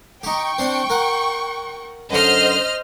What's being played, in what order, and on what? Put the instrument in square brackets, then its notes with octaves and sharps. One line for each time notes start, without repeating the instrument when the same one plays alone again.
[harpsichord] D#4 G4 [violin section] G5 C#6
[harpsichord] C4 D4 C5
A#4 F#5
[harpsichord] F#2 D3 C6 [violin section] C5 D#5 F6